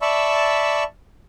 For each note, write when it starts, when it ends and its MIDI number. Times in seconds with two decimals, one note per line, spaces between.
0.02 0.84 74
0.02 0.84 76
0.02 0.84 81
0.02 0.84 83
0.02 0.84 85
0.02 0.84 88